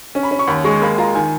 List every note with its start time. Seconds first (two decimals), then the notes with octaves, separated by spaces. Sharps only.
0.15 C#4
0.23 B5
0.31 C#4
0.39 C#6
0.48 D#2 B5
0.64 G#3 C#6
0.82 A#3 B5
0.98 F4 A#5
1.15 D#3 G#5